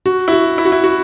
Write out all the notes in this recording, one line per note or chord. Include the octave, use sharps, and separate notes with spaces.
F#4
E4
F#4
E4
F#4
E4
F#4